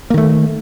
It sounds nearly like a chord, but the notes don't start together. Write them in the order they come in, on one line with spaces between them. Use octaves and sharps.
A#3 D#3 A3